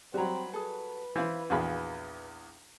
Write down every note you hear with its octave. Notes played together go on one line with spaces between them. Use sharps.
F#3 G3 C4 F#4 A#5 B5
G#4 A4 B4
E3 C5 F5 B5
A#1 E2 F#4 G#4 F5 B5